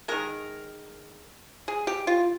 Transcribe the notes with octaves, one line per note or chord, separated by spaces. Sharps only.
D#3 G#3 A#4
G#4
G4
F4